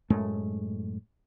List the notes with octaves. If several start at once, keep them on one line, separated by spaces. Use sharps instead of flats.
F#2 A2 G#3 A3